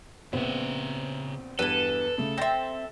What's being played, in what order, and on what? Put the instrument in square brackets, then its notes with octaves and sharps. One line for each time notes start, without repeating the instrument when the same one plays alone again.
[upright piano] A#1 B3 C4 [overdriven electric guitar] C#3 E5
[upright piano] E2 G2 [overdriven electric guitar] A4 [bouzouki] B4 G#5
[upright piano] C#3 A3
[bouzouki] C4 E5 [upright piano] A6 A#6